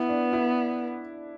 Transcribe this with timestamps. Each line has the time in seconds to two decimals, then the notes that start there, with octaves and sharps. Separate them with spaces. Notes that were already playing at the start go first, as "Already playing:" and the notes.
Already playing: B3 E4
0.09 D4
0.33 E4